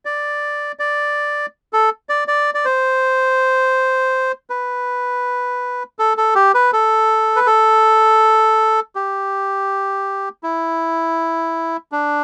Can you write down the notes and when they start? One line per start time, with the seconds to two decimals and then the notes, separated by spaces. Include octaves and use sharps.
0.05 D5
0.79 D5
1.73 A4
2.09 D5
2.28 D5
2.54 D5
2.65 C5
4.50 B4
5.99 A4
6.17 A4
6.35 G4
6.54 B4
6.73 A4
7.36 B4
7.46 A4
8.95 G4
10.43 E4
11.92 D4